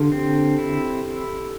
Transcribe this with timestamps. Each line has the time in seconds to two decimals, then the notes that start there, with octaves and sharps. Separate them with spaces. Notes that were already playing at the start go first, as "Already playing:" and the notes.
Already playing: D3 F4 G4 A4
0.12 C4
0.58 E4